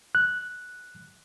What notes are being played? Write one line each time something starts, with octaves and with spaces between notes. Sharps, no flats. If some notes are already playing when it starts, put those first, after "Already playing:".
F#6